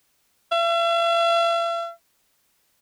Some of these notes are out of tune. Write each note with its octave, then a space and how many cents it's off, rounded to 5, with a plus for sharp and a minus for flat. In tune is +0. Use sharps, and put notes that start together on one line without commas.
E5 +45